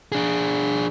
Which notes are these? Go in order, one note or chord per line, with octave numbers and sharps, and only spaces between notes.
D4 G#4